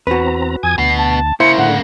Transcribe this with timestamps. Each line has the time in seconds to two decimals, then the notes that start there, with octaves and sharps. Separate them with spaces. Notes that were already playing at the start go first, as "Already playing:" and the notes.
0.07 E2 C4 F#4 B4 A#5
0.63 F2 G#5 D#6 G#6
0.78 D2 B2 B3 C7
0.98 A5
1.40 C#3 A#3 E4 C5 C#7
1.58 A2 D3 F#5